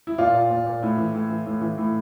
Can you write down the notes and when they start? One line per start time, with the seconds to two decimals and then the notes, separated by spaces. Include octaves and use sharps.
0.07 E4
0.18 A#2 F4
0.34 A#2
0.51 A#2
0.66 A#2
0.83 A2
0.98 E3
1.15 A2
1.30 E3
1.46 A2
1.61 E3
1.78 A2